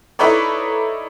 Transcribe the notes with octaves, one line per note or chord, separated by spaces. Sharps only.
D#4 E4 A4 B4 C#5 D5